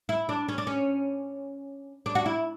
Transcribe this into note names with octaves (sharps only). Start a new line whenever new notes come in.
E4
D4
C#4
D4
C#4
D4
F#4
E4